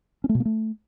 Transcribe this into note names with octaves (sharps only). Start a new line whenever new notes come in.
C#4
A3
B2
A#3
A3